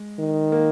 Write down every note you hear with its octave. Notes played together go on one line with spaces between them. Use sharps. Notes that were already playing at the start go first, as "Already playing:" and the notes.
Already playing: G#3
D#3
A#3